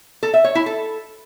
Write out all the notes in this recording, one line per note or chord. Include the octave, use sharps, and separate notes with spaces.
A4
E5
C#5
E4
A4